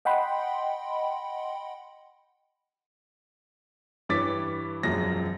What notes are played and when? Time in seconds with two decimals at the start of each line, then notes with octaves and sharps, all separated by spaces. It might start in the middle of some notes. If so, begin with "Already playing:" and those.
0.05 D#5 F#5 G5 B5 C6
4.09 G2 E3 C#5 D6 A6 B6
4.83 E1 F#2 F3 A#6